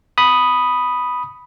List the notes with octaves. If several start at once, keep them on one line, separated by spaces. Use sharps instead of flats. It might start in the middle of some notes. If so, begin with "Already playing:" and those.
B5 D#6